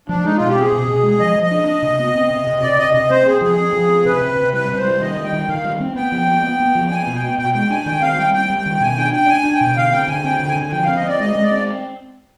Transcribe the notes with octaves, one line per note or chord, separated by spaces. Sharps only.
F3 D4
G#3 D#4
B2 F4
G4
C4 G#4
B2
B2
G#3
F3 D#5
F3
D#5
D4
D4
C3
B3
C4
C3
C3
C3 D5
C3 D#5
C3 D#5
C4 C5
C4 G#4
F3 G#4
C4
F3
C4
C3 B4
C3
C3
G3 B4
C3
C5
G3
D#3 D#5
G3
G5
D#3
D#3 F5
G3
C4
B3 G5
F3
B3
B3
B3
F3
B3 G#5
B2
G5
B3
B2 G5
G#3 G5
D4 G#5
D#3 G5
C4 F5
G3 G5
C4 G5
G3
G5
D#3
B2 G#5
D4 G5
D4 G5
D4 G#5
D4
G5
B2
D3 F5
C4 G5
D3 G#5
C4 G5
D3
G#5
D3
G#5
F3 G5
C4 F5
D#5
C4 D5
G#3 D#5
G#3
D5
C4